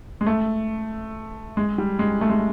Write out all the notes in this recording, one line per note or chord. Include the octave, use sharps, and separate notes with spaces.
G#3
A3
G#3
G3
G#3
A3
G#3